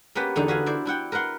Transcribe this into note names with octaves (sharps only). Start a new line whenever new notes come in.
A#3 B3 C#4 G4 B4
E2 D3 D#4 A4
F#4 B4 F5 G#5
E4 C5 D5
D4 E4 F#5 G5
A#4 B4 E5 F#5 C6